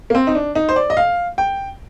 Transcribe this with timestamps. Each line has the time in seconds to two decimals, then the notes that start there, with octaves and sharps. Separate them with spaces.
0.10 A#3
0.15 C4
0.27 D#4
0.35 D4
0.55 D#4
0.69 C5
0.76 D5
0.90 D#5
0.97 F5
1.38 G5